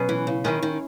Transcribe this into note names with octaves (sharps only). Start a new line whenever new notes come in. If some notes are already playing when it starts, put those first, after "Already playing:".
Already playing: B2 F#3 C#4 G#4
E3
C#3
D#3 G#3 C#4 E4 G#4
D#3